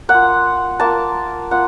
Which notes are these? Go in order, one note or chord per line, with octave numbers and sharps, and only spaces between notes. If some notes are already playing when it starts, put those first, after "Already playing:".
A#3 F#5
F4
A#3 F4 A5
A#3 F4 F#5